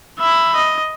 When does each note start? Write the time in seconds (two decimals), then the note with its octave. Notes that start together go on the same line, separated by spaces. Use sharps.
0.20 E5 B5
0.56 D#5